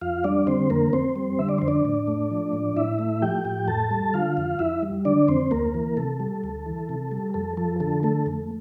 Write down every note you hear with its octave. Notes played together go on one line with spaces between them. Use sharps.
F2 F4 F5
G3 D4 D5
D3 C4 C5
F2 A#3 A#4
F2 C4 C5
G3
D3 E5
D5
F2 C5
D4 D5
A2
A3
F3
A2
A2 E4 E5
A3
F3 G4 G5
A2
F2 A4 A5
G3
D3 F4 F5
F2
F2 E4 E5
G3
D3 D4 D5
F2 C4 C5
D2 A#3 A#4
E3
C3 A4
G3
D2
E3
C3
G3
F2 A4
F3 A4
D3 A4
A3 A4
F2